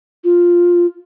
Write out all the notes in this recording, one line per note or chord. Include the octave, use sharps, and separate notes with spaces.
F4